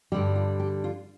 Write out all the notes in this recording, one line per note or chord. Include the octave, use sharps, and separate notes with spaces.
G2 D3 G3 G4
F4
G4
F4